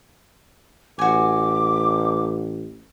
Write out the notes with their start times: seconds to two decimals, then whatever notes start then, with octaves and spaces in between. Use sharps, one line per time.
0.99 A1 F#4 G#5 D6